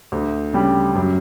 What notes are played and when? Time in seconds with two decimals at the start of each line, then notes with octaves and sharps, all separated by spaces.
0.12 D2
0.53 C#3 G3
0.95 F#2